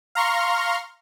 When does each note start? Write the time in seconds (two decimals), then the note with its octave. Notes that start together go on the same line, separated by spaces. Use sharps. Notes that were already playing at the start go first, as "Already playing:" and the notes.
0.15 F5 A#5 C6 C#6 F6